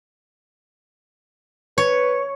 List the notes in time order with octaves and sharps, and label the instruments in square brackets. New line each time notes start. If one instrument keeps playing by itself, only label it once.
[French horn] B4 [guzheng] C#5